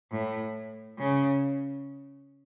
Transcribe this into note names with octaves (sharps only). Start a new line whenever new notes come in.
A2
C#3